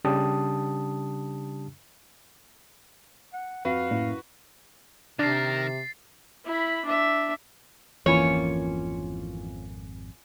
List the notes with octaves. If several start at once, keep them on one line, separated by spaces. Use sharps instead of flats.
C#3 G3 D4 G4 A5 D#6
F#5
F2 F#4 B4 F5
F#2 A2 A#3 E4
C3 D#3 D4 A#4 A6 C7
E4 B5
D4 E5
G#1 F2 E3 A#3 C#4 F4 C#5